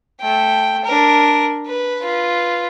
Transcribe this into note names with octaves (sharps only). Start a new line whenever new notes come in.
A3 G5
D4 A#4
B4
F4 B4